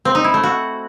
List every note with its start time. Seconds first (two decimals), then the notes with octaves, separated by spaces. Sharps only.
0.05 C4
0.15 D#4
0.24 E4
0.34 A3
0.43 F#4